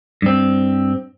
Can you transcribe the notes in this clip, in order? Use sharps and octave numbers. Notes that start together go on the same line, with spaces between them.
G2 C4